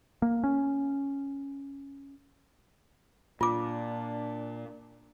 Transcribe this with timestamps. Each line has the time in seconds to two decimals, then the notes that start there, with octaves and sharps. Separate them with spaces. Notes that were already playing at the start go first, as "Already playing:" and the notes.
0.22 A#3
0.44 C#4
3.41 A#2 D4 F4 D6